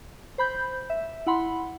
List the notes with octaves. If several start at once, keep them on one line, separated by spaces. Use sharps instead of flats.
C5 B5 G6
E5
E4 F#5 B5 C6